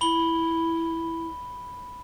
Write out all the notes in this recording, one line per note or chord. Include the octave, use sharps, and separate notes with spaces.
E4 B5 G7